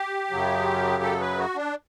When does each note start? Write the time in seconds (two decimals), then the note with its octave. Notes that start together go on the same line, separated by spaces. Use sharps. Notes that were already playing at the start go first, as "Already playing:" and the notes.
Already playing: G4
0.30 F#2 C#3 F#3
1.03 A4
1.21 B4
1.38 F#4
1.56 D4